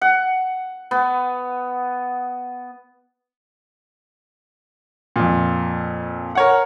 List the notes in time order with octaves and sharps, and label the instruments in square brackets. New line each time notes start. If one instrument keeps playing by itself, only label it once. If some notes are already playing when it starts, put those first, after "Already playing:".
[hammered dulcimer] F#5
B3
[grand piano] F2 A#2
A#4 C#5 F#5